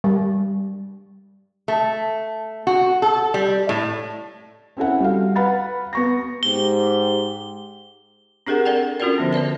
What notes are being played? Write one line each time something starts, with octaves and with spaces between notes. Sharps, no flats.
G3
A3
F#4
A4
G3
A2
C4 C#4 E4 A4 F#5
G3 F#4 F5
B4 F5 F#5 B5 A6
B3 C#6 A#6
G#2 G4 G7
C4 D4 G4 G#4 A#4 F#5
A4 A#4 D5 F#5 G5
C#4 F4 F#4 A4 A#4 D5
D3 F3 B3
A4 B4 D5 A5